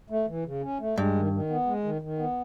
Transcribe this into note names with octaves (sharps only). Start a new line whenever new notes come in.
A3
E3
C#3
C#4
A3
G2 G#3
D#3
D#3
B3
G#3
D#3
D#3
B3